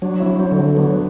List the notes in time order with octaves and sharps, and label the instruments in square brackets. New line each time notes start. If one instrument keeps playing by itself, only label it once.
[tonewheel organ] F#3 [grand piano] D4 F#4
[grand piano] C4 E4
[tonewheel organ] F#3
[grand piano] C4 E4
[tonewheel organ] D3
[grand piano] D4 F#4
[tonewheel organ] F#3 [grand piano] B3 D4